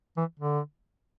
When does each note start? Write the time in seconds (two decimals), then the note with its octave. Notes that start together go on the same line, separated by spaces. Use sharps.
0.17 E3
0.40 D3